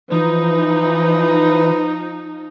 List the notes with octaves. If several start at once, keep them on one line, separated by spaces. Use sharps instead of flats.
E3 F3 D#4 B4